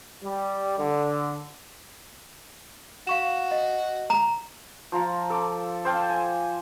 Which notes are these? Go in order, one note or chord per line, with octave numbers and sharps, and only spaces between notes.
G3
D3
F#4 F5 C#6 E7
D#5
A#5
F3 F4 A#5
A4 D6
C5 F5 G5 A5
G#5